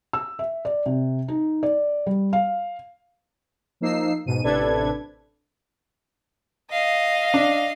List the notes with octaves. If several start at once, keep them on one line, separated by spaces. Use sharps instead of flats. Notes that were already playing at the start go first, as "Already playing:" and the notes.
E6
E5
D5
C3
D#4
D5
G3
F5
F3 A#3 D#4 E6 C7
G#2 B2 D#7
A1 C3 D4 A4 B4 G#6
D#5 F5
D4